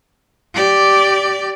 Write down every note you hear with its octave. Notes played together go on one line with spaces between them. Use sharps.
G4 D5